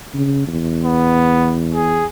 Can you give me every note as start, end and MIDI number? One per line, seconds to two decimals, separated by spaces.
0.15 0.45 49
0.48 2.08 40
0.84 1.57 59
1.75 2.06 68